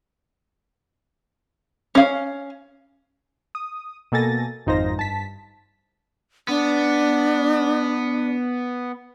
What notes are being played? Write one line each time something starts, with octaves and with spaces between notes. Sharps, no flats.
C#4 F5
D#6
B2 A#3 A4 G#5 A6 A#6
G#1 F2 D#4 F4 C5 A#6
G2 A5 B6
B3 D4